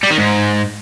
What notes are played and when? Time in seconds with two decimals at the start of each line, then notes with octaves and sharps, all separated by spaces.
0.03 G3
0.10 D#3
0.18 G#2